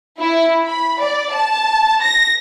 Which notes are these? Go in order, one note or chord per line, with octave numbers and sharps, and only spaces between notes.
E4
B5
D5
A5
A#6